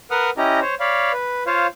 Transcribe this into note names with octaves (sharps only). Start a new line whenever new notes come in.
A#4 B4 F#5 D#6 F6
C#4 E4 G4 D#5 A#5
C5 C#5
C#5 D5 F5 B5
B4
F4 C5 C#5 F5